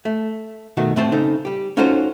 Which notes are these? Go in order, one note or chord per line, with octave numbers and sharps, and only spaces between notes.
A3
B2 D#3 A3 F#4
A2 A3 C4 C5 A5
C#3 C4 D#4 A4
G3 G4
C#4 D#4 F4 F#4 A4 C5